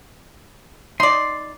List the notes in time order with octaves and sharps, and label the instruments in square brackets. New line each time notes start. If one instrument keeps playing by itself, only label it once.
[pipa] D#4 D5 [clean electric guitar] C6